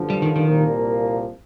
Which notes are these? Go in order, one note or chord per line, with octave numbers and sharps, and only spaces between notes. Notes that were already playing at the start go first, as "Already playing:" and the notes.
Already playing: G2 D3 F3
G3
D#3
D#3
C2 A#2 F3 A#3